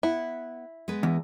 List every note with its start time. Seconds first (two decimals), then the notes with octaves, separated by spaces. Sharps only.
0.03 B3 E4 F#5
0.88 G#3 B3 B4
1.03 E2